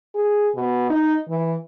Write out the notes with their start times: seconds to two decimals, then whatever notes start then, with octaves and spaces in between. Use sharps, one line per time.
0.15 G#4
0.55 B2
0.90 D#4
1.29 E3